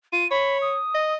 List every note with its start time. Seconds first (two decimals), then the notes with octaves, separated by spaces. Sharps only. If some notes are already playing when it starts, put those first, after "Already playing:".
0.13 F4 D#7
0.31 C#5 B5
0.62 D#6
0.94 D#5